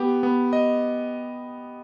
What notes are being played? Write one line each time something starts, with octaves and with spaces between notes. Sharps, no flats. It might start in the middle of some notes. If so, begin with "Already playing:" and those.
Already playing: B3 G4
B3
D#5